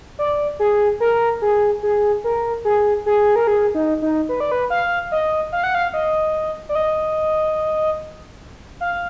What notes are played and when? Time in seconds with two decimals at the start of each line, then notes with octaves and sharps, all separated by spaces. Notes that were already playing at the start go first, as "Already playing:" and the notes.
0.19 D5
0.59 G#4
1.00 A#4
1.42 G#4
1.83 G#4
2.24 A#4
2.65 G#4
3.06 G#4
3.36 A#4
3.47 G#4
3.75 D#4
4.02 D#4
4.29 B4
4.40 D5
4.52 B4
4.70 F5
5.12 D#5
5.52 F5
5.64 F#5
5.75 F5
5.94 D#5
6.69 D5
6.75 D#5
8.81 F5